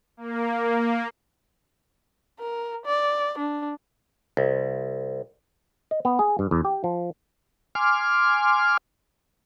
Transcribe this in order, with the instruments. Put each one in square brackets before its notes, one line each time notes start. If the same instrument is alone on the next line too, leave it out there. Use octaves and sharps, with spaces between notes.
[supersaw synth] A#3
[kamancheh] A#4
D5
D4
[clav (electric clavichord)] C2
D#5
B3
G#4
G2
E2
G4
F3
[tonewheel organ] G#5 C6 D6 F6